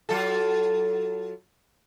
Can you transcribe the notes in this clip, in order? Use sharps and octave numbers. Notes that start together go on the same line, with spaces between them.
F#3 F4 A4